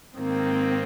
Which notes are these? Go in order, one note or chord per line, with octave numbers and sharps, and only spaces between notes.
G#2 D#3 A#3 C4